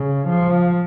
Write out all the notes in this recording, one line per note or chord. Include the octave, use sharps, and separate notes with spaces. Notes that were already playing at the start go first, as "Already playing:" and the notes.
Already playing: C#3
F3